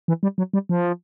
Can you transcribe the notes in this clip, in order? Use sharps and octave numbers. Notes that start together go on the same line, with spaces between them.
E3
G3
F#3
G3
F3